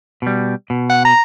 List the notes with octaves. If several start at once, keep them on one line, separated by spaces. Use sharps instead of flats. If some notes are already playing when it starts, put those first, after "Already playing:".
B2 G3
B2
F#5
A#5